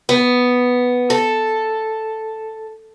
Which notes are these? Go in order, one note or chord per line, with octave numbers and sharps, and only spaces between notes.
B3
A4